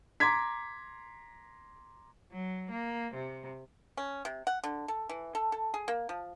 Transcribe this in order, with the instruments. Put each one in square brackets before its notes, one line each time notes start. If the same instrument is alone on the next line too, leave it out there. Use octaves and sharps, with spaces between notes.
[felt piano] A#5 C6 D6 G#6 B6
[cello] F#3
A#3
C3
[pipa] C#4
C3
F#5
D3
A4
E3
A4
A4
G#4
A#3
F3